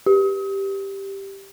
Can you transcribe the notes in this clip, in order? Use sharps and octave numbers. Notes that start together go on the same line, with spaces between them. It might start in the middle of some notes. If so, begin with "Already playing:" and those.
G4